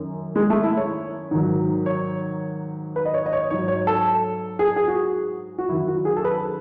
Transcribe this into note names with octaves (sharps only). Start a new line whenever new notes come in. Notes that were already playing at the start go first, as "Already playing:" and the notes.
Already playing: F#2 D#3
G#3
A3
E4
C#5
G#2 D#3 F#3
C#5
B4
D#5
C#5
D#5
C#5
G#2 F#3 C#5
C#5
A4
G#4
G#4
F#4
F#4
F#2 D#3 F#3 E4
F#4
G#4
A4
B4